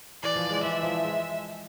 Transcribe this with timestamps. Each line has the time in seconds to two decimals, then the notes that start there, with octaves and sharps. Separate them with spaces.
0.23 E3 D5
0.36 F3
0.50 G#3
0.63 E3 E5
0.83 F3
1.04 G#3